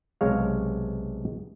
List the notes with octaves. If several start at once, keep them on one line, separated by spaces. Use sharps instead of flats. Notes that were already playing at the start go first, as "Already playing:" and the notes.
B1 C3 G#3 C#5 F5